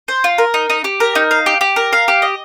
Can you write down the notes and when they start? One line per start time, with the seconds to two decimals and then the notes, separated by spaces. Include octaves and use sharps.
0.08 C5
0.24 F4
0.38 A#4
0.54 D#4
0.70 D#4
0.84 G4
1.00 A#4
1.15 D#4
1.31 F5
1.46 G4
1.61 G4
1.76 A#4
1.93 F5
2.08 G4
2.22 D#5